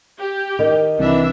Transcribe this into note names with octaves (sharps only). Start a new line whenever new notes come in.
G4
D#3
C2 E3 D4 E5